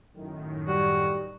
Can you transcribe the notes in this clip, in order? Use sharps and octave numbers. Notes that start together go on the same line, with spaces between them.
F#2 A2 D#3
G3 F#4